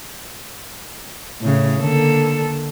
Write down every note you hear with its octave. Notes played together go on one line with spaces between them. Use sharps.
A2 C#3
D3 A#3 A4